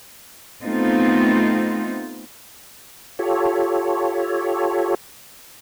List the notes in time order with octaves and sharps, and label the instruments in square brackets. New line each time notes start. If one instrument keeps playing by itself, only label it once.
[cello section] A3 B3 C4 D#4 F4
[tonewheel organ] F4 G4 A4 C#5